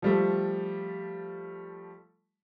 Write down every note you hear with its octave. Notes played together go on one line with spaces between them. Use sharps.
F3 G3 A3